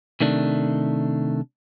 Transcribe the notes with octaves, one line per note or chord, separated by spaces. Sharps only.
C3 D#3 A3 D4